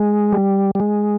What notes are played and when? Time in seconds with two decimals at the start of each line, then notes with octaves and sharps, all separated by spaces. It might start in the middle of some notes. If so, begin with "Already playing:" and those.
Already playing: G#3
0.32 G3
0.75 G3
0.80 G#3